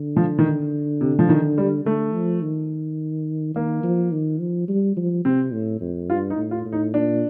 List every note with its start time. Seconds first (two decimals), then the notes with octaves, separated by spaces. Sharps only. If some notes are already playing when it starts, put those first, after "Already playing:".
Already playing: D3
0.17 F3
0.39 D#3
1.01 C3
1.19 F3
1.29 D#3
1.58 G3
1.85 D3 A3
2.14 F3
2.42 D#3
3.55 D#3 A#3
3.84 F3
4.12 D#3
4.40 F3
4.68 G3
4.97 F3
5.25 C3 C4
5.53 A2
5.81 F2
6.10 G2 F4
6.30 D#4
6.37 A2
6.51 F4
6.65 A2
6.72 D#4
6.93 A#2 D4